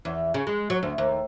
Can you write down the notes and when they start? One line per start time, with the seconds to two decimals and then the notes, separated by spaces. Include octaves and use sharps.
0.05 E2
0.34 C#3
0.47 G#3
0.70 F#3
0.83 D2
0.98 D#2